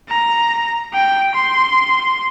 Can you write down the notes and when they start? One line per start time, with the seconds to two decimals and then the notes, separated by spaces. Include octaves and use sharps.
0.08 A#5
0.93 G5
1.35 C6